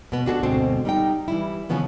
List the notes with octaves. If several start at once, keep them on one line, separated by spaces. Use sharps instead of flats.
B2 B3
D4 F#4 G#4 A4
D2 G#2 B2 C4 C5
G3 D#4 G5
E3 G3 E4
C#3 E3 F3 B3 C#4